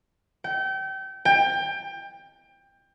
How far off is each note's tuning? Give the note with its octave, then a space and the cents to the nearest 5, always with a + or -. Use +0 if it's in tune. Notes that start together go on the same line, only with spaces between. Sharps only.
G5 -30
G5 +20